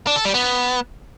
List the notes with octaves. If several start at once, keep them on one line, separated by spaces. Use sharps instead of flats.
D4
A4
G3
B3